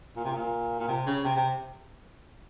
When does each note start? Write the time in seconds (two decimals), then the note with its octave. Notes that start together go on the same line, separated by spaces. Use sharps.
0.16 A#2
0.25 C3
0.32 A#2
0.80 A#2
0.88 C3
1.06 C#3
1.24 C3
1.36 C3